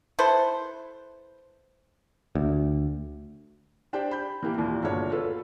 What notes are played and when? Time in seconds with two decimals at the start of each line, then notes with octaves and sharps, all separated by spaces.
0.19 E4 A4 B4 C5
2.35 D2
3.93 D4 G4 C5 D5 G5
4.11 B5 G6
4.43 E3 A#3 G4
4.56 D#2 A#2 E3
4.83 G1 A#2 F#4 C#5
5.12 F4 A4 B4